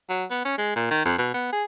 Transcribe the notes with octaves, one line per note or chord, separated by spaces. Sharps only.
F#3
B3
C#4
G#3
A#2
D#3
F2
B2
B3
G#4